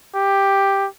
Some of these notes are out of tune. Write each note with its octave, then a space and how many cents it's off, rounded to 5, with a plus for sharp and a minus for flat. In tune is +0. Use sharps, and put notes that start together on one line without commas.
G4 +5